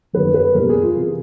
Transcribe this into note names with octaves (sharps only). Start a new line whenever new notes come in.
F#1 F#2 D#3 G3 B4
B4
F#1 E2 B2 G3 A#4
G#4
F4
C3 E3